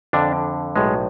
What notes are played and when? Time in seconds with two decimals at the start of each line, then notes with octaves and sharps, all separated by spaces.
0.13 F2 D3 D4
0.76 B1 A2 G#3